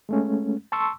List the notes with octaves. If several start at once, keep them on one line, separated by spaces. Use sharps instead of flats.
G#3 A3 C#4
A5 C6 C#6 E6